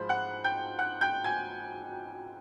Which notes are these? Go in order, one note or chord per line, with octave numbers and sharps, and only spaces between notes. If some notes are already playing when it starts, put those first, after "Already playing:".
Already playing: G#2 F3 G#3 C5 B5
F#5 F#6
G5 G6
F#5 F#6
G5 G6
G#5 G#6